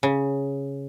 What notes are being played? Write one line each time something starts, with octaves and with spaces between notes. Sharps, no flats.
C#3